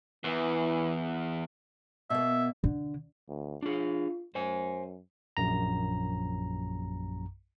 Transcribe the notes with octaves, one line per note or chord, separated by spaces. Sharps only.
E2 E3
B2 A#3 E5
D3
D2
D4 F4 G#4
F#2 C5 G#5
A#1 F#2 A#5